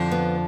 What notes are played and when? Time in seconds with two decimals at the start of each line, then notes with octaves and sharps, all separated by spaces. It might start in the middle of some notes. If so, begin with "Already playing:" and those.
Already playing: F2 D3 F3
0.12 B3